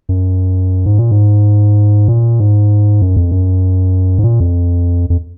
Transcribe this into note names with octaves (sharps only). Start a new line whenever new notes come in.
F#2
G#2
A#2
G#2
A#2
G#2
F#2
F2
F#2
G#2
A#2
F2
F2